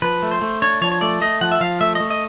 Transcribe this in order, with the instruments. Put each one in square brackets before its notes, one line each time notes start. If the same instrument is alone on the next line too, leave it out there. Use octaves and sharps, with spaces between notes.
[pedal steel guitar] F3 B4
A3
C5
A3
D4 C#5
F3 C#5
C#5
A3 D5
A3 D#5
F3 F#5
E5
F3 F5
A3 E5
A3 D#5
D#5